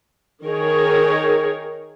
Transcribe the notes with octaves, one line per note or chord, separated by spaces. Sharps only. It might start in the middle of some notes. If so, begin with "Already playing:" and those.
D#3 D#4 G#4 A#4 C#5